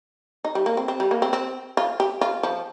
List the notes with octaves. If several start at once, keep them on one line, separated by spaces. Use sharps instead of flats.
D#4
G3
A#3
C4
C4
G3
A#3
C4
C4
F4
G4
F4
F3